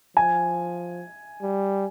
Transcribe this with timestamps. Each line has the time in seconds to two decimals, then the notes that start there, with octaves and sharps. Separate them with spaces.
0.17 F3 G#5
1.42 G3